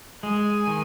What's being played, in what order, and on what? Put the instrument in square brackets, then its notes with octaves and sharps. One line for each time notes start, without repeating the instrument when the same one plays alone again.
[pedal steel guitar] G#3 [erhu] G#5
[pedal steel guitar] D#3